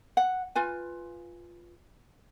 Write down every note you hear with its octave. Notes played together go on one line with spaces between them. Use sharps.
F#5
F4 B4 G#5